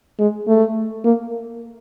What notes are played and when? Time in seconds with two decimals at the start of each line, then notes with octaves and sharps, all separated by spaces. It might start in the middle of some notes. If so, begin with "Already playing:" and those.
0.19 G#3
0.48 A3
1.04 A#3